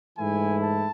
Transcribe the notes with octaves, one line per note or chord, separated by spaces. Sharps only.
G#2 E3 A3 E4 G#5
A5